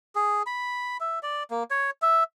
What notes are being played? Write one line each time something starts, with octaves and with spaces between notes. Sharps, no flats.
G#4
B5
E5
D5
A#3
C#5
E5